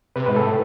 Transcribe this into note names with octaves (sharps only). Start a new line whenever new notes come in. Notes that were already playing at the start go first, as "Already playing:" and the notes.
C3 B4
G#2 B4
A2 A4